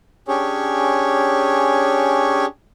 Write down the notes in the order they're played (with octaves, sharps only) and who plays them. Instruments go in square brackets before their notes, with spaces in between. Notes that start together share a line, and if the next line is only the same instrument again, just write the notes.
[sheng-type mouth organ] C#4 D4 G4 G#4 C#5